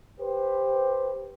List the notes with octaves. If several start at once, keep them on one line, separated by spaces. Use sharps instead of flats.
G4 B4 C5